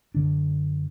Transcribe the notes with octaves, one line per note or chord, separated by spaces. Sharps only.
F#2 D3 D4